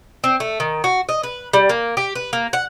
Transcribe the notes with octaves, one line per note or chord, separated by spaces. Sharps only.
C4
A3
D#3
F#4
D#5
B4
G3
A#3
G4
B4
A#3
F#5